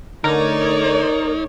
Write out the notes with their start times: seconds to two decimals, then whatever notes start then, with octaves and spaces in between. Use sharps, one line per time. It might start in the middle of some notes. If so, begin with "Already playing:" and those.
0.24 D3 A3 D#4 A#4 C#5 D5